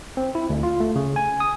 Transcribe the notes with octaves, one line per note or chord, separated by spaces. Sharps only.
C4
E4
D2
F4
A3
C#3
G#5
D#6